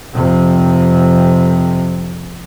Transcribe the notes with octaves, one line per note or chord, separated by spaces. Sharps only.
F2 C3